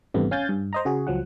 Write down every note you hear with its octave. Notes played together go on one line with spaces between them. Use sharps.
G#1 E2 G2 C3 A3 B3
C#4 F5 G#5 G6 A6
G2
C5 D#5 A#5
C#3 F#4 G#4
C#2 F3 F#3 F#5